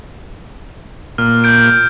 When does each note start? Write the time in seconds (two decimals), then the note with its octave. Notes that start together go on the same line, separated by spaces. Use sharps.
1.18 A#2 F6
1.44 G6 D7